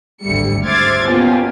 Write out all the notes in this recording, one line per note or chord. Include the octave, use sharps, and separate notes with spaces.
G#1 D2 G3 A3 C#7
C5 E5 D6 F6 G#6 A6
B2 A#3 C#4 F4 G4